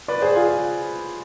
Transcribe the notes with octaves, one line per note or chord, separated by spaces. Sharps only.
B4 D5
G#4 C5
F4 G#4